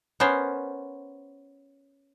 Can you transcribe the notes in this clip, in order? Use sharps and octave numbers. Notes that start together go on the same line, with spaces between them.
B3 C#4 A#4 C5